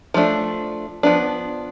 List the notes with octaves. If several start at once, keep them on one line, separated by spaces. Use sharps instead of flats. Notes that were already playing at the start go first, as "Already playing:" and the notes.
F3 A3 D4
F3 B3 D4